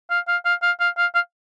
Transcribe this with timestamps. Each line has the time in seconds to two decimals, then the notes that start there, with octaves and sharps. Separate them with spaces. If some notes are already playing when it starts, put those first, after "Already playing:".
0.10 F5
0.28 F5
0.45 F5
0.62 F5
0.80 F5
0.98 F5
1.15 F5